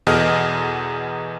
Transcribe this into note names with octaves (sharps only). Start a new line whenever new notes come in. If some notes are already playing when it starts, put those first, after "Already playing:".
E2 B2 G#4 A4 D#5 F6